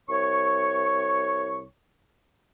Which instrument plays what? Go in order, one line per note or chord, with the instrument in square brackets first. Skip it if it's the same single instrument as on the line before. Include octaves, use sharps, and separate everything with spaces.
[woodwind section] C2 C#5 C#6